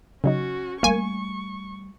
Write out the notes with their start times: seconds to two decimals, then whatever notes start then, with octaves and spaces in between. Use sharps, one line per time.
0.24 C#3 F#3 C#4 D#4 F#4
0.83 G3 A3 A#3 G#5 C#6